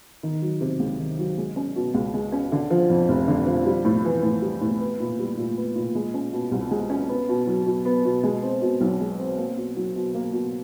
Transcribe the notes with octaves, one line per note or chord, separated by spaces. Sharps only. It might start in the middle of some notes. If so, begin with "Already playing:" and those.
D#3
F#3
C3
C#2
D#3
F#3
G#3
C#4
B2
C#2
G#3
C#4
D3
F3
F2
F1
D3
F3
G3
A2
E3
A2
G3
A2
B3
A#2
G3
A#2
B3
A#2
G#3
C#4
B2
C2
G#3
C#4
B3
B2
F#3
B2
B3
B2
G#3
C4
B2
B1
G#3
C4
A#3
B2
F#3
B2
A#3
B2